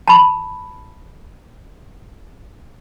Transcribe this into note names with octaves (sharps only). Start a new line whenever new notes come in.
A5 B5